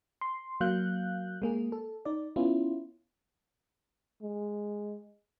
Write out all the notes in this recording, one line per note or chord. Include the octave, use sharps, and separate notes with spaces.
C6
F#3 A#3 F5 F#6 G6
G#3 A#3 G#4
A4
D#4 D5
B3 C#4 E4 F4
G#3